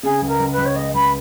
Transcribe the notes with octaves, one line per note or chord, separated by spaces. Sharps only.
C#3 G#4
C#2
A#4
C#2
B4
C#2
C#5
G#3 D#5
C#2 B5